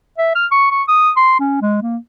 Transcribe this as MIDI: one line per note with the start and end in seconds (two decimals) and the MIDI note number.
0.18 0.33 76
0.35 0.46 89
0.52 0.69 85
0.71 0.83 85
0.88 1.10 87
1.17 1.36 84
1.40 1.57 61
1.62 1.79 56
1.82 1.97 58